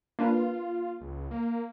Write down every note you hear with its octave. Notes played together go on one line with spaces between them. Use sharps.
A#3 D4 F4 B4
C#2
A#3